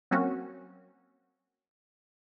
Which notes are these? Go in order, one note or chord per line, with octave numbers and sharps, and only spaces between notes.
F#3 A#3 C4 C#4 F#4